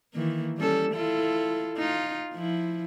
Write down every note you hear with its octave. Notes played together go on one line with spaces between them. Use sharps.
D#3 E3 A#3
G3 C#4 A4
E4 F4 A4
D#4 F4
F3 E4